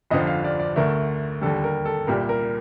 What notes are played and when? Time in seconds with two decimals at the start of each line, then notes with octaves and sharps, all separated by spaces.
0.11 G1 F2 D3 F3 D#5
0.27 F5
0.44 D5
0.60 D5
0.76 D2 D3 A3 A#4
1.41 D#2 D3 G3 A4
1.64 A#4
1.85 A4
2.07 C2 A#2 G3 A#4
2.29 A#4